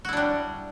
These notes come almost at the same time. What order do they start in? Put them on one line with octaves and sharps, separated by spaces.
F#4 E4 D4 G3